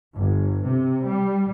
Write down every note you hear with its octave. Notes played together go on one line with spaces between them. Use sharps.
G1
C3
G3